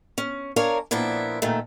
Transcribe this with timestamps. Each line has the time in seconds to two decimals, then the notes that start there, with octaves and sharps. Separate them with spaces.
0.18 C#4
0.56 D4 A#4 C#5 F5 G#5 A#5
0.91 A#2 F3 B3 D4 E4
1.42 A#2 D#3 A3